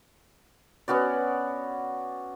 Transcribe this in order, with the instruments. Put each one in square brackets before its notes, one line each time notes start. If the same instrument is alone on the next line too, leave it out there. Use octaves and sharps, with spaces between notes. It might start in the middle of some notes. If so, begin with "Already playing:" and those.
[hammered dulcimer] B3 C#4 F#4 D5